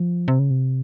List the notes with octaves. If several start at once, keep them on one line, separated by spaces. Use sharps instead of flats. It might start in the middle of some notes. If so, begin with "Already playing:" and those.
Already playing: F3
C3
C#3
C3